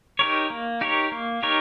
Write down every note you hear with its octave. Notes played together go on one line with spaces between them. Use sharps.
D#4 G4 A#4 C#5
A#3
D#4 G4 A#4 C#5
A#3
D#4 G4 A#4 C#5